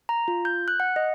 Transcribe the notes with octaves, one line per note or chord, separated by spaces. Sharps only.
A#5
F4
G6
F#6
F#5
D#5